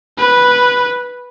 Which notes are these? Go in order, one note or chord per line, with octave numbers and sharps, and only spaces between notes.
B4